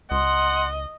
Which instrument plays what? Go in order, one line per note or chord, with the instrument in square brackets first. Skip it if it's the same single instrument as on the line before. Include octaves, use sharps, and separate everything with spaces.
[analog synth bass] C#2 [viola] D#5 [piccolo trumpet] F#5 [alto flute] C6